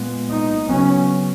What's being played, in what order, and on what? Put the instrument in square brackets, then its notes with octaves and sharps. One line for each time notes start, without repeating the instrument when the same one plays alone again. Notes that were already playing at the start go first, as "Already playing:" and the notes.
Already playing: [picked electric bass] A#2 G#3 B3
[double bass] D#4
[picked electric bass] C#3 F#3 B3 [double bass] C#4